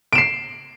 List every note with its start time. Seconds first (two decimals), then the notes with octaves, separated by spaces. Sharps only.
0.13 D7
0.15 E7
0.18 C7